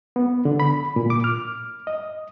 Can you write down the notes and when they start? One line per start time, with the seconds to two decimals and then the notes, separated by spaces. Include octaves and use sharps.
0.16 B3
0.45 D3
0.60 B5
0.96 A#2
1.10 D6
1.24 F6
1.87 D#5